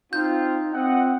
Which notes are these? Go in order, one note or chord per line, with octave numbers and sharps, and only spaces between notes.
C4 D#4 F4 G6
C4 F4 D#5 F#5